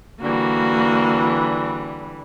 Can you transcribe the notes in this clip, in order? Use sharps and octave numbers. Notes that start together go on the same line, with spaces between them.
D3 E3 G3 A#3 F#4